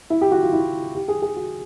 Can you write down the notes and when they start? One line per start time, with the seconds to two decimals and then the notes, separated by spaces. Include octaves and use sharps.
0.10 E4
0.21 G4
0.32 F#4
0.42 F4
0.53 E4
0.95 G4
1.08 G#4
1.22 G#4
1.36 F#4